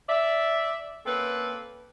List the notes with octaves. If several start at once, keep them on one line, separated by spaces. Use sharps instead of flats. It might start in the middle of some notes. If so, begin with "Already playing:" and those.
D5 E5
A#3 C4 C#4 A4 B4